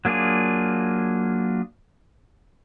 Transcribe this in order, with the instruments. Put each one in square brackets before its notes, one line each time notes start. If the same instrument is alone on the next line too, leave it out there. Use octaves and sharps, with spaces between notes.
[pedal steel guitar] F#3 A#3 D4 F4 G#4